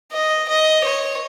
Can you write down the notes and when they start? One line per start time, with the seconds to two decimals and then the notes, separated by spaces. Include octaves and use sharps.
0.13 D#5
0.49 D#5
0.84 C#5